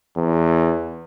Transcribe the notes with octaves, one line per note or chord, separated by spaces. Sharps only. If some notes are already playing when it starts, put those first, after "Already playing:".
E2